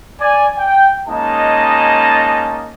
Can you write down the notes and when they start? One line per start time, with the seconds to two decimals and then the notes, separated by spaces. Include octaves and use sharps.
0.20 D5 G#5
0.58 G5
1.08 G#3 A#3 C#4 D#4 D#5 A5